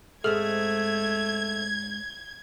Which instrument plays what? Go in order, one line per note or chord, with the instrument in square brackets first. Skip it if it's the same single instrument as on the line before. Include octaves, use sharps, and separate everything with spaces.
[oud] G#2 G#3 C4 [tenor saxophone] A3 [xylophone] G#4 A4 F6 [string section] G#6